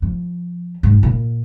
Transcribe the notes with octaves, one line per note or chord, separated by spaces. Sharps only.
F3
G#2
A#2